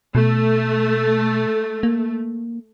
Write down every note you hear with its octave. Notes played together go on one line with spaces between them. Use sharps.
B2 A3
A#3